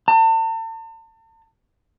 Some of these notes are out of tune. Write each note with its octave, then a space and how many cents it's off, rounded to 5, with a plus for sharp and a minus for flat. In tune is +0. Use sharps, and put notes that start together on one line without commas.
A5 +40